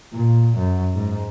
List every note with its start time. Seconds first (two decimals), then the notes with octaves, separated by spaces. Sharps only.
0.14 A#2
0.58 F#2
0.95 G#2